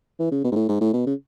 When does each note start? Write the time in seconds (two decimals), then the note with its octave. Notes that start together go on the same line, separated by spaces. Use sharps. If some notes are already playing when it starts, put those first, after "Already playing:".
0.19 E3
0.31 C#3
0.44 B2
0.51 G#2
0.56 A2
0.69 G#2
0.81 A2
0.93 B2
1.06 C#3